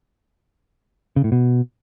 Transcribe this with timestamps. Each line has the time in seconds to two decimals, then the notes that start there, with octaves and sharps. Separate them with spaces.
1.16 C#3
1.24 A2
1.32 B2